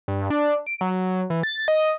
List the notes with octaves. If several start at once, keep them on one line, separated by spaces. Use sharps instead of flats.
G2
D4
D7
F#3
E3
A6
D#5